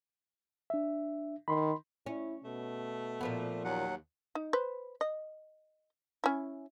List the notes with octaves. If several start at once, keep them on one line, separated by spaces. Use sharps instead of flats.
D4 E5
D#3 B5 C6
C#4 E4
B2 A3
A#2 F3 B3
D#2 F#3 F#5
D#4
B4 C5
D#5
C#4 E4